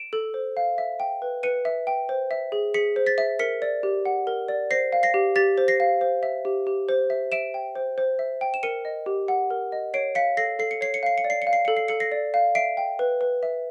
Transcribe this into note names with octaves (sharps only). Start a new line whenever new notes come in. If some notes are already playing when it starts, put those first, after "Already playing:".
Already playing: D7 E7
A4
C5
F5
E5
G5
B4
B4 C#7 D#7
E5
G5
C5
E5
G#4
G#4 B6 C#7
C5
A6 B6
E5
A#4 B6 C#7
D5
G4
F#5
A#4
D5
C5 A#6 C7
F5
A#6 C7
G4
G4 A6 B6
C5
A#6 C7
F5
C5
E5
G4
G4
C5
E5
E5 D7 E7
G5
C5
C5
E5
G5
E7
A#4 C#7 D#7
D#5
G4
F#5
A#4
D#5
C#5 C7 D7
F5 B6 C#7
A4 A#6 C7
A4 C7
C#7
C#5 C7
C#7
F5 C7
C#7
D5
C7
C#7
F5
C7
A4 C#7
C7
A4 C#7
A#6 C7
D5
F5
E5 C7 D7
G5
B4
B4
E5